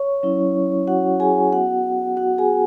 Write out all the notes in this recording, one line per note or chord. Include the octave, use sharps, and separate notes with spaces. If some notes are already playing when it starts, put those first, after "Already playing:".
Already playing: C#5 C#6
F#3 C#4 E4
F#4 F#5
G#4 G#5
B3 F#4 F#5
F#4 F#5
G#4 G#5